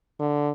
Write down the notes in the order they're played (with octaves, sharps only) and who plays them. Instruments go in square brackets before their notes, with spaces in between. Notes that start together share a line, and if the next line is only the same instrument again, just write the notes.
[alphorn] D3